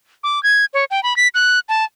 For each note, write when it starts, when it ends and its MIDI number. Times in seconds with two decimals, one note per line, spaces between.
0.24 0.42 86
0.43 0.65 92
0.74 0.84 73
0.91 1.03 79
1.03 1.16 83
1.17 1.28 95
1.35 1.59 90
1.69 1.84 81